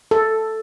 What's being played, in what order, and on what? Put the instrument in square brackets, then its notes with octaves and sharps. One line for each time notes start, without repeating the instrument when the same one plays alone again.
[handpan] A4